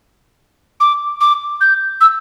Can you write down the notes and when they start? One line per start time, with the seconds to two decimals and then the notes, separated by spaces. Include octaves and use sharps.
0.80 D6
1.21 D6
1.61 G6
2.01 E6